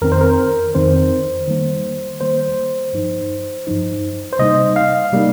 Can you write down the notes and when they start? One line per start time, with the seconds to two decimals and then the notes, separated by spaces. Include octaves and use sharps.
0.02 F2 D#3 C4 A#4
0.12 C5
0.21 A#4
0.75 F2 D#3 C4 C5
1.48 D#3 G3 A#3
2.21 D#3 G3 A#3 C5
2.93 G2 F3 D#4
3.67 G2 F3 D#4
4.33 C5
4.39 C3 G3 A#3 D#4 D#5
4.76 F5
5.13 C3 G3 A#3 D#4